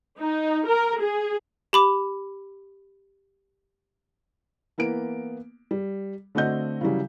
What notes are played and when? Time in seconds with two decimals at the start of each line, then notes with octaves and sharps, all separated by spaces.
0.18 D#4
0.67 A#4
1.00 G#4
1.73 G4 B5 D6
4.78 E3 A#3 B3 D7
5.71 G3
6.35 D3 A3 C4 F#4 D#5 G6
6.81 C#3 E3 F#3 G3